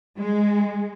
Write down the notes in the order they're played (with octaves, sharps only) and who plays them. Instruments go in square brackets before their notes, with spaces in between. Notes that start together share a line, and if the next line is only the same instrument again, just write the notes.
[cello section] G#3